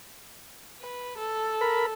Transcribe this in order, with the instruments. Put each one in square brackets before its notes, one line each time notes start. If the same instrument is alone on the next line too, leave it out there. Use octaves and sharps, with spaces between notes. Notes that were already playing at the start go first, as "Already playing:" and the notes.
[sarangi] B4
A4
[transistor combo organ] A#4 B5